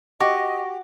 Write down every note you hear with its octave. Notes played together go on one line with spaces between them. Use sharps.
F#4 G4 D#5 C#6 D6 A#6